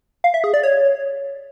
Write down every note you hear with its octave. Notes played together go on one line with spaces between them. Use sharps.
F5
E5
G#4
D5
C#5